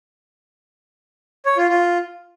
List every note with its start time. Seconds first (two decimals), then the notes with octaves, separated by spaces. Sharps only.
1.46 C#5
1.57 F4
1.69 F4